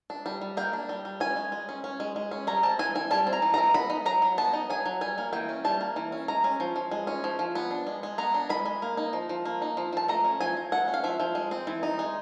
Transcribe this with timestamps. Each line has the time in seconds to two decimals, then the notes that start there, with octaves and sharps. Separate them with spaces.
0.10 D4
0.26 G3
0.42 G3
0.57 A#3 G5
0.73 D4
0.89 G3
1.05 G3
1.20 C#4 G#5
1.36 G#3
1.52 G#3
1.69 C#4
1.84 C#4
2.00 G#3
2.16 G#3
2.31 C#4
2.47 G3 A#5
2.63 C4 A5
2.79 E3 G#5
2.95 E3 G#5
3.11 G3 A5
3.27 C4
3.33 A#5
3.42 E3
3.54 E3 A#5
3.74 B3 B5
3.90 D#4
4.06 F#3 A#5
4.22 F#3
4.38 B3 A5
4.53 D#4
4.70 F#3 G#5
4.86 F#3
5.01 G3 G#5
5.18 A#3
5.33 E3 G5
5.49 C#4
5.64 G3 A5
5.81 A#3
5.96 E3
6.12 C#4
6.28 G#3 A#5
6.44 C#4
6.60 F3
6.76 F3
6.91 G#3
7.07 C#4
7.24 F3
7.39 F3
7.55 B3
7.71 D4
7.87 G#3
8.03 G#3
8.18 B3 A#5
8.34 D4
8.49 G#3 B5
8.66 G#3
8.82 A#3
8.97 D#4
9.13 F3
9.29 F3
9.45 A#3
9.62 D#4
9.77 F3
9.93 F3 A5
10.08 A3 A#5
10.25 C#4
10.40 F3 G#5
10.57 F3
10.72 A3 F#5
10.88 C#4
10.94 F5
11.04 F3 E5
11.20 F3
11.35 G#3
11.51 C4
11.67 E3
11.83 D#4
11.99 G#3